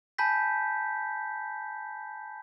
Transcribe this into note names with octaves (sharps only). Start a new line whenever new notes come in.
G#5 A5 B5 G6 B6